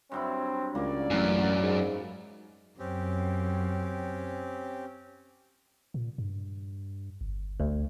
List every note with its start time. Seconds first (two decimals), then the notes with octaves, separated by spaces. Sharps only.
0.12 G2 F#3 C4 E4
0.75 C#2 A#3 D5
1.10 A1 F#2
1.63 G#2
2.79 F#2 C4 C#4 G4
5.94 A#2
6.18 G2
7.21 G1
7.60 D2